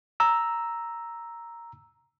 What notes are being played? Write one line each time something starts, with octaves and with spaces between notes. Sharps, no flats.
A#5 E6